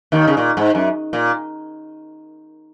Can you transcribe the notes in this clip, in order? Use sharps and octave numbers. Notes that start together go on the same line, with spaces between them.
D#2 D#3
C#3
A#2
G#2
F#2
A#2